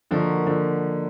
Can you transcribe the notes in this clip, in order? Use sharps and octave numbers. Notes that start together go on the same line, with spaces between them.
D3 D#3 F3 A#3 D#4 F#4
D3 F3